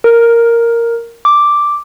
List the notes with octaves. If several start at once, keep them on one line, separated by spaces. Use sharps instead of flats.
A#4
D6